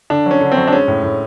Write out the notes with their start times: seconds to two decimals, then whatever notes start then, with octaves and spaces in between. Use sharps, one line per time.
0.10 D3 D4
0.26 F#3 C#4
0.41 D3
0.52 C4
0.57 F#3
0.67 D4
0.72 G#3 C#4
0.88 A2
1.03 A2